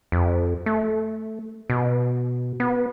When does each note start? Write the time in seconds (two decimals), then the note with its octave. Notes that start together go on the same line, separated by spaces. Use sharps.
0.12 F2
0.66 A3
1.70 B2
2.60 B3